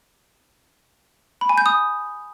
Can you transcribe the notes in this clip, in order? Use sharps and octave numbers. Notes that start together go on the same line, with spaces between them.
B5
G#5
G6
D#6